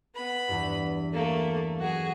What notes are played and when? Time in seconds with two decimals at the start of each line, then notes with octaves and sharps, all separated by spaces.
0.15 B3 B5
0.48 E2 G2
1.13 A3 A#3
1.80 F#3 F#4 G#4